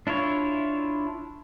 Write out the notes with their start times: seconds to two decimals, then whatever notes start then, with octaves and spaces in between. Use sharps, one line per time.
0.07 D4 E4 F4 C#5